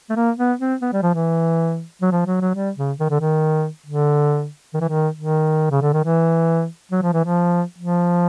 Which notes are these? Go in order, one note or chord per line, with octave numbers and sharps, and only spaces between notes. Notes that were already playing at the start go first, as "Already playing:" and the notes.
A3
A#3
B3
C4
B3
G3
F3
E3
F#3
F3
F#3
F#3
G3
C#3
D#3
D3
D#3
D3
D#3
E3
D#3
D#3
C#3
D3
D#3
E3
F#3
F3
E3
F3
F3